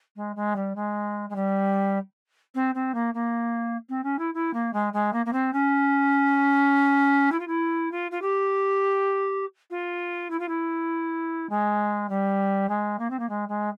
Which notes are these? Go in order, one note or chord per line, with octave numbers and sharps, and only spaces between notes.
G#3
G#3
G3
G#3
G#3
G3
C4
C4
A#3
A#3
C4
C#4
E4
E4
A#3
G#3
G#3
A#3
A#3
C4
C#4
E4
F4
E4
F4
F4
G4
F4
E4
F4
E4
G#3
G3
G#3
A#3
C4
A#3
G#3
G#3